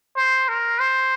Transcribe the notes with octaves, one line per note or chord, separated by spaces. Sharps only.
C5
A#4
C5